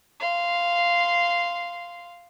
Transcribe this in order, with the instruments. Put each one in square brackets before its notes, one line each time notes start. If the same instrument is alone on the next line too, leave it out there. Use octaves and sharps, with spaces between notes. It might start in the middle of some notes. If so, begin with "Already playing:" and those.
[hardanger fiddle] F5 C6